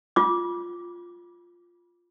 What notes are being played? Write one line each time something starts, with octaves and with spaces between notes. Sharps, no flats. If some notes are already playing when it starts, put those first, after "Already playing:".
F4 D6